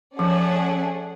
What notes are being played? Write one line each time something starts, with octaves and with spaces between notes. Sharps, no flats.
F3 A3 C#4 G#4 D5 F#5